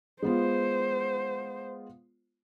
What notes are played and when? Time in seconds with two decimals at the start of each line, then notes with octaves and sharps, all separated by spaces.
0.23 G#3 B3 F4 C5